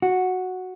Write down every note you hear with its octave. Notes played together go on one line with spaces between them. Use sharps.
F#4